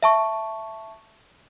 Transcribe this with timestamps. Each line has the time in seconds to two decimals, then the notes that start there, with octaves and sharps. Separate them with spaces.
0.03 E5 A5 C#6